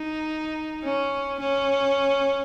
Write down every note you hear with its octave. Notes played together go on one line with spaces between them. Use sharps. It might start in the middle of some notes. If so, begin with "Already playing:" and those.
Already playing: D#4
C#4
C#4